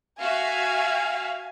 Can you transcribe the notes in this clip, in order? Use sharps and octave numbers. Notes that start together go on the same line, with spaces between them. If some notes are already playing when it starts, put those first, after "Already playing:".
F#4 E5 F5 G#5